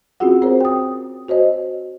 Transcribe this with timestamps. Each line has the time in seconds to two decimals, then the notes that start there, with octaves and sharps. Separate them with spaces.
0.20 C4 C#4 F4 F#4 G#4 F#5
0.42 C4 G#4 A#4 C5 C#5
0.61 G5 D#6
1.28 F#4 C5 C#5 D#5